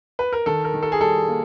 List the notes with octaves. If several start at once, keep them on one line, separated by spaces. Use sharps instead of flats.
B4
A#4
D#3 A4
A#4
D#3
A4
G#4
G3 A4
A#3